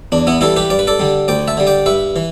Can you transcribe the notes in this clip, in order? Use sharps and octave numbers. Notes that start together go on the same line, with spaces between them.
E2 D4
B3 E4
E3 G3 E4 A4
G4 B4
G2 D5
B4
A4 D5
D3 G3
D2 D5 G5
E5 A5
D3 G3
D5 G5
G2 B4 E5
E3